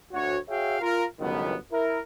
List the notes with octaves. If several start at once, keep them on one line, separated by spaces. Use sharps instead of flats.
D2 F#4 C#5
F#4 G#4 C#5 E5 F5 G5
F4 A#4
G1 C#2 D#3 F#3 B3
E4 A#4